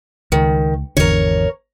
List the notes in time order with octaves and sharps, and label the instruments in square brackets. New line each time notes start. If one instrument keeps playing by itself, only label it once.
[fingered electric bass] C#2 [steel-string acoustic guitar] D#3
[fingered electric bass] G#1 E2 D3 [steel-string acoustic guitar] A#4 C#5